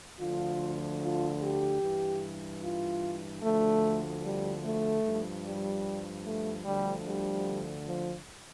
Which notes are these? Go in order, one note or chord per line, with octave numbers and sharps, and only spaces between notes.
D2 D3 F3 F4
F4
G4
G2 E3
F4
D2 D3 F3 A3
G3
A3
G2 F3
G3
A3
D2 D3 F3 G3
G3
F3